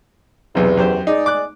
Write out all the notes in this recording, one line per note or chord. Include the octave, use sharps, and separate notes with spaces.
B1 E2 C3
F#2 G4 C5
G#3 D#4 G#4 D5
D6 F#6